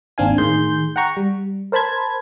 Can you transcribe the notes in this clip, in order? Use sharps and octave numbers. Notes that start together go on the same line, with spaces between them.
G#1 D#2 C4 D4 F5 G#5
A2 D#3 G#4 C6 G6
F#5 G5 A#5 C#6
G3
A#4 C5 A5 B5 G#6